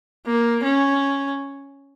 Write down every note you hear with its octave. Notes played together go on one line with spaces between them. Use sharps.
A#3
C#4